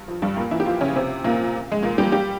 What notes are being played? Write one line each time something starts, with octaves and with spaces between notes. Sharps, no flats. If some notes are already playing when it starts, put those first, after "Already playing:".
Already playing: G2
F3
G2 G3
A#2 A#3
E3 E4
G4
F3 F4
C#3 C#4
C3 C4
A#2 A#3
G#3
A#2 A#3
G3 G4
G3 G4